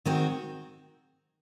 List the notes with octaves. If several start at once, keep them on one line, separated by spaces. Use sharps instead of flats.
D#3 G#3 C4 F#4